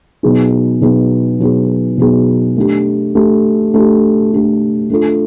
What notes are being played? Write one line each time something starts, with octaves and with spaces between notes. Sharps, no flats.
B2 F#3 B3 D#4 G#4
B2 F#3 B3 D#4 G#4
B2 F#3 B3 D#4 G#4
B2 F#3 B3 D#4 G#4
A3 D4 G4
A3 D4 G4
A3 D4 G4
A3 D4 G4
A3 D4 F4 A4